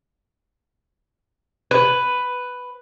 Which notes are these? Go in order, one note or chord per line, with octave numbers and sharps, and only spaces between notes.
B4